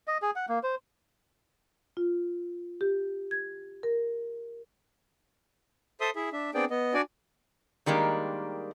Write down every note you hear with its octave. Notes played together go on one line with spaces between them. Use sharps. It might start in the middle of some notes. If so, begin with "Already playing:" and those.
D#5
G#4
F#5
A#3
C5
F4
G4
G#6
A#4
A4 C5 E5 C6 D#6
E4 G#4 E5
D4 E5
B3 C4 D4 G#4 D5 G5
B3 D#5
D4 F#4 D5 G#5
D#3 G3 G#3 A#3 D4